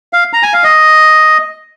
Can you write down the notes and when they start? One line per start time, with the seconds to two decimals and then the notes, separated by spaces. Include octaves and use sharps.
0.13 F5
0.33 A#5
0.43 G#5
0.53 F5
0.64 D#5